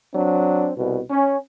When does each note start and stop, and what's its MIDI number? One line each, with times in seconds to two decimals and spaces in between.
0.14 0.72 54
0.14 0.72 60
0.14 0.72 62
0.76 1.00 36
0.76 1.00 47
1.10 1.37 61